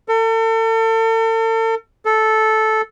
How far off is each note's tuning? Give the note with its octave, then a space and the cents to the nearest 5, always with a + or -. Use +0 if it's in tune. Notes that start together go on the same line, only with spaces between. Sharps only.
A4 +40
A4 -10